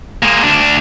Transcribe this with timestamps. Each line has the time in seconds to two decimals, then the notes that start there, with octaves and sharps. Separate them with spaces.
0.23 G#3 A#3
0.42 D2 D4